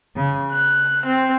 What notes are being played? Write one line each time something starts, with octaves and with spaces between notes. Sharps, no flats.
C#3
F#6
C4